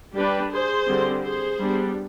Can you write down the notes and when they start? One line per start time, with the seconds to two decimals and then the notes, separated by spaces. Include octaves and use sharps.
0.15 G3 D4 G4 B4
0.51 G#4 C5
0.87 D3 G3 C4
1.23 G#4 C5
1.59 G3 B3 D4